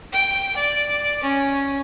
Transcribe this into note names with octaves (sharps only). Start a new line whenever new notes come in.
G5
D5
C#4